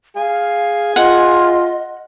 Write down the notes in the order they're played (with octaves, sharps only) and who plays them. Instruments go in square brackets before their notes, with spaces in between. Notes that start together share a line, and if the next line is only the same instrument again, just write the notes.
[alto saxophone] G#4 [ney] F5
[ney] F4 [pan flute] D#5 [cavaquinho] F#5